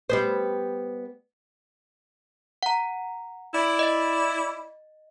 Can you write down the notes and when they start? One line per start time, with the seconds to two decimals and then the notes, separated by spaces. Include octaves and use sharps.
0.09 G3 B3 C5
2.63 F#5 A#5
3.54 E4 D5
3.79 D#5 A6